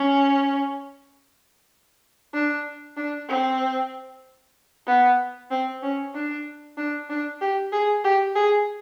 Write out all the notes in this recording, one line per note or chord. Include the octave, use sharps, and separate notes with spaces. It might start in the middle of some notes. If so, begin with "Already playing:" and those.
Already playing: C#4
D4
D4
C4
B3
C4
C#4
D4
D4
D4
G4
G#4
G4
G#4